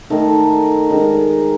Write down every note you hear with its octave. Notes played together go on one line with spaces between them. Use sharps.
D#3 A3 D#4
D#3 G#3 D#4